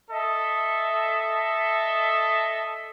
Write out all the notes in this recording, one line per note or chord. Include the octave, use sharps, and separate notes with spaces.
A4 D#5 E5